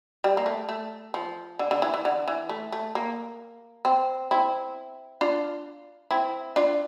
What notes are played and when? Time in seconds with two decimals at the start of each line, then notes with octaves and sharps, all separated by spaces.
0.24 G3
0.37 A#3
0.46 A3
0.69 A3
1.14 F3
1.59 D3
1.71 D3
1.82 E3
1.94 E3
2.05 D3
2.28 E3
2.49 A3
2.72 A3
2.95 A#3
3.85 C4
4.31 C4 E4
5.21 D4 F4
6.11 C4 E4
6.56 D4 F4